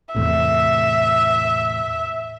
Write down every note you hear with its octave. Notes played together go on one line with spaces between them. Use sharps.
E2 A2 C3 E5